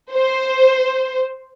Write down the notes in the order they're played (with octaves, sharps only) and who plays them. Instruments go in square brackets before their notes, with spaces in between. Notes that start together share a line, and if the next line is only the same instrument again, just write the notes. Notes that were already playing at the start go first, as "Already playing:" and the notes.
[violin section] C5